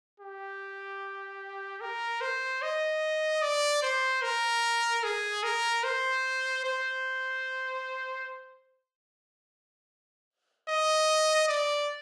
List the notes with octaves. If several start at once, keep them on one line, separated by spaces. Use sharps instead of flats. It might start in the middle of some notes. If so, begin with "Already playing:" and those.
G4
A#4
C5
D#5
D5
C5
A#4
G#4
A#4
C5
C5
D#5
D5